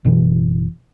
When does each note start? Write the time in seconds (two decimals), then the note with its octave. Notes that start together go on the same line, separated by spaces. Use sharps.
0.05 F#1 B2 E3